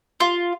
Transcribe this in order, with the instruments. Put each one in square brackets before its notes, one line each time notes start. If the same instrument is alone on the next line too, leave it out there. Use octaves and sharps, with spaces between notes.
[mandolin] F4